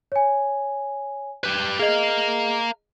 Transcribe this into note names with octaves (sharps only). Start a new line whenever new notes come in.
C#5 G#5
G4 B4
G#4 A#4 D#5 F5